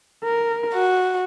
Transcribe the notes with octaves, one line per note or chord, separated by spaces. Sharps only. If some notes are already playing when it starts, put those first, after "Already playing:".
A#4
F#4